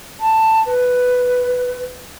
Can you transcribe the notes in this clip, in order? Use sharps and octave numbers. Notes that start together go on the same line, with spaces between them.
A5
B4